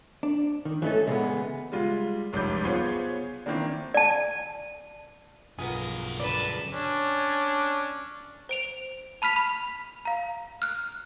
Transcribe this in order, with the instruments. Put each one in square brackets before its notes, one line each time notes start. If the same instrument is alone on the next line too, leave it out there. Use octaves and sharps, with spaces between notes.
[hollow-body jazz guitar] D4
D#3
[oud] G2 D#4 A4 [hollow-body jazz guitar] E3 A3 C#4
[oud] A#2 C#3 E3 [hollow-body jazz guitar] G#3 B3
[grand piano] G3 G#3 F4
F1 C#2 F#2 G3 D6 G6
B3 F4 G#4 C5 C#5
D#3 E3 A#3 C4 D4
[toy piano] D5 A5
[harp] B1 F4 [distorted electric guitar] G2 A#4 [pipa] B3 G#4
[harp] G1 C#2 [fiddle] B4 A5 [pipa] D5
[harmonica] C#4 D4
[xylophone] C5 D7 F7
A5 B5 F6 B6 F7
B5
F5 A#5
F6 F#6